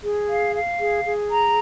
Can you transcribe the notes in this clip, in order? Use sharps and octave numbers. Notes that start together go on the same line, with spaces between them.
G#4
F5
F5
G#4
G#4
A#5